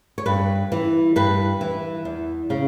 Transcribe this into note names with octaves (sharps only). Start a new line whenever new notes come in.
C#5
G2 B4
E3
G2 B4
E3
E2
C#3